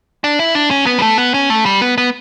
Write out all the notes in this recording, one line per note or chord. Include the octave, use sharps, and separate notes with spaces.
D4
E4
D4
C#4
B3
G3
A3
B3
C#4
A3
G3
B3
B3